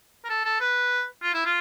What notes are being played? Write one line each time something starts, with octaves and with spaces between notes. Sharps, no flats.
A#4
A4
A4
B4
F4
E4
F4